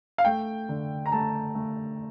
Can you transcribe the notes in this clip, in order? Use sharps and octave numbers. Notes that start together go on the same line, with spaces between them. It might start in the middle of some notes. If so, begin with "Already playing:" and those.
F5
A3 G5
D3
A#5
A3 A5
A3